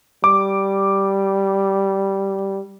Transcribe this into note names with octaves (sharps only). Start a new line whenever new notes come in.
G3 D6